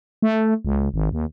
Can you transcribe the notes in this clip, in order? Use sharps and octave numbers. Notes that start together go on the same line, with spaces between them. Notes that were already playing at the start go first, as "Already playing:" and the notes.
A3
C#2
G#1
D#2